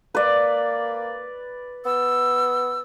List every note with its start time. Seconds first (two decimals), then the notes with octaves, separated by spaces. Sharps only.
0.15 A#3 B4 D5
1.86 B3 E6